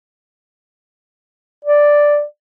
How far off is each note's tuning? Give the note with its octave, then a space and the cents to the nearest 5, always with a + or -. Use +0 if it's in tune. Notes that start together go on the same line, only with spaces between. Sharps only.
D5 +0